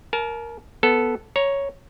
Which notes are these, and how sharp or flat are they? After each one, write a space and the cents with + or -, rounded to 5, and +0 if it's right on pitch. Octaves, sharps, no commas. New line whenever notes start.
A#4 +0 A5 -40
B3 +0 A4 +0
C#5 +0 A#5 +15